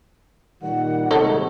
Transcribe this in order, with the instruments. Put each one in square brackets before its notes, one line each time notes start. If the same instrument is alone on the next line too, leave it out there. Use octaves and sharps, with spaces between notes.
[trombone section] A#2 D#3 G3 [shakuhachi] F#5
[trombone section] G#1 C3 [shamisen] D#4 A4 C#5